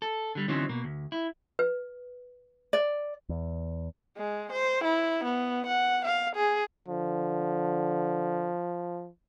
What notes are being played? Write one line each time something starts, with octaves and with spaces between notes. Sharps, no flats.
A4
D3 G3
D3 E3 F#3 C4 C#4 D#4
B2 A#3
D2
E4
B4
D5
E2
G#3
C5
E4
B3
F#5
F5
G#4
D3 F3